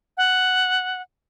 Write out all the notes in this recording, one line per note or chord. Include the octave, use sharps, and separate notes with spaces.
F#5